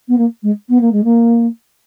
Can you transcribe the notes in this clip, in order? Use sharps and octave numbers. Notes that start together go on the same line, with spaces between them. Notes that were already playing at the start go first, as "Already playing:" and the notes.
B3
A#3
G#3
B3
A#3
G#3
A#3